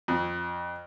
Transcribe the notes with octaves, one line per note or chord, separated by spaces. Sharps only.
F2